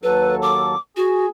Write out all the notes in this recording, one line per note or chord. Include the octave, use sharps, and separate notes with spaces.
D#2 F#3 A4 B4
D6
F#4 G#4